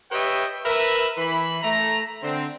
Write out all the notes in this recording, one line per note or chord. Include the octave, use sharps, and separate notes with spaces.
G4 B4 C#5 D#5 E5 G5
A#4 B4 E5
E3 B5
A3 A#5
D3 C4